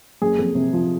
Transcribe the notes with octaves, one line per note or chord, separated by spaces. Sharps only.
F#1 G#4
F2
C3
F3